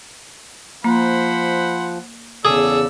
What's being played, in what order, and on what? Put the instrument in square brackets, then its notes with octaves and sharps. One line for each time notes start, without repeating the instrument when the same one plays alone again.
[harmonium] F3 [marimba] A#3 [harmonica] C5 F#5 B5
[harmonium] E2 C#3 [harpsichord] G#4 [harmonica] A4 D5 E6 [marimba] D#6